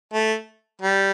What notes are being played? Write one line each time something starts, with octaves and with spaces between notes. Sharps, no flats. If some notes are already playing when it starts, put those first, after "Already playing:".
A3
G3